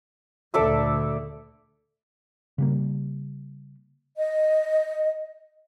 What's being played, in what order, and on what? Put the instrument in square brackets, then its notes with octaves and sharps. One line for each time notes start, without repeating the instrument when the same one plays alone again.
[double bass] D2 A#2 [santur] A4 D5 E5
[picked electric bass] C#3 G3 A#3
[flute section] D#5